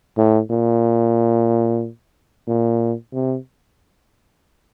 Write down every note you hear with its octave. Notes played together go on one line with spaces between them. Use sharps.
A2
A#2
A#2
C3